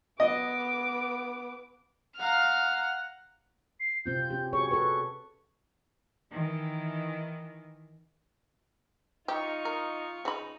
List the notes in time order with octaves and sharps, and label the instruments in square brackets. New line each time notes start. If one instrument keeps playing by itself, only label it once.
[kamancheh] B3 D6 [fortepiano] D#5
[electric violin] F5 A#5 [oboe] F#5 [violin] F6
[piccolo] C7
[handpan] C3 C4 F4 [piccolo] G6
[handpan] C#4 G4
[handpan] F#4 G#4 C#5 [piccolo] C#6
[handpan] A4 B4 [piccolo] C#6
[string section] D#3 E3
[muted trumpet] D#4 [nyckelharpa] F4 C#6 [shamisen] G4
[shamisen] A#4
[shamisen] C#3 B5 [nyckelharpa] D#4